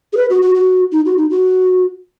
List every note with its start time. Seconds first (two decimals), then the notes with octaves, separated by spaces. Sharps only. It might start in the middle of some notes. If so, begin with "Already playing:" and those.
0.13 G#4
0.17 B4
0.30 F#4
0.42 F#4
0.55 F#4
0.92 D#4
1.06 F#4
1.17 D#4
1.30 F#4